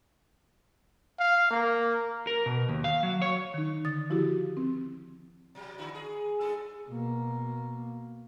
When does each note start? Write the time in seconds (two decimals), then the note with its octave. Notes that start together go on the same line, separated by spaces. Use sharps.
1.19 F5
1.51 A#3
2.27 A#4
2.46 B2
2.69 D#2
2.84 F5
3.03 F#3
3.22 C#5
3.54 D#3 D#4
3.85 D3 D#6 A6
4.10 F3 E4 F#4 G4
4.57 C4
5.55 B2 F#3 G3
5.78 D3 E4 F#4
5.95 G#4
6.40 G2 G#4 A4
6.89 B2 A#3